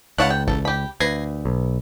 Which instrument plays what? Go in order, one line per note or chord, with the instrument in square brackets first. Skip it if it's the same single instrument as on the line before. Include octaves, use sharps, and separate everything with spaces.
[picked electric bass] C#2 [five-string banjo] E4 C#5 F5 [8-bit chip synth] F#5 A5 F#6
[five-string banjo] G5
[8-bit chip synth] A1 [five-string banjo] A4
[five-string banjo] G4 B5
[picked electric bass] D2 [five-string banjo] B4 [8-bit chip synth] G#6 A#6 C7
[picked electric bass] B1